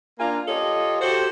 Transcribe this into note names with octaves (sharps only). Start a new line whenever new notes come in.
A#3 D4 F4 G#5 A#5
F4 G4 A4 C#5 D#5
F#4 G4 A4 C5